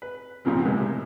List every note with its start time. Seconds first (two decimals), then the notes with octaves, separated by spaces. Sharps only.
0.02 B4
0.45 B1 A#2 C#3 F3 C4
0.65 A2 C3 D#3 G#3 A#3